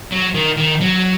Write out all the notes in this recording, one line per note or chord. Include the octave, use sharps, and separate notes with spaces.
F#3
D#3
D#3
F#3